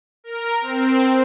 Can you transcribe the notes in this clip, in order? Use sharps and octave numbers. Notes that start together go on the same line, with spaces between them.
A#4
C4